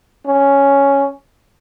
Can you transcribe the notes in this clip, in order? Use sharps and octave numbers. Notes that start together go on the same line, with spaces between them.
C#4